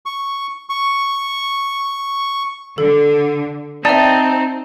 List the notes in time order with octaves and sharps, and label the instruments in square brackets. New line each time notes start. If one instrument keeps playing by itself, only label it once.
[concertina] C#6
C#6
[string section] D3 [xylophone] A4
[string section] C4 [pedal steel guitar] D#4 A5 [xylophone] D5 E5